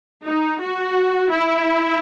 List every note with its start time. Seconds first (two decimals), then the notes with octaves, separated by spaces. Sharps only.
0.25 D#4
0.61 F#4
1.30 E4